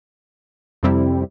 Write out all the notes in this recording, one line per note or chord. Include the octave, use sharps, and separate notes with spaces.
F2 C3 G3 C4 E4